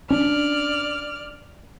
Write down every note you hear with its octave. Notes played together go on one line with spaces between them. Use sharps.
C#4 D4 D5 F6